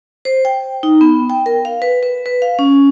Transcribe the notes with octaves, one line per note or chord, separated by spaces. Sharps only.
C5
G5
D#4
B3
G5
A#4
F5
B4
B4
B4
F5
C#4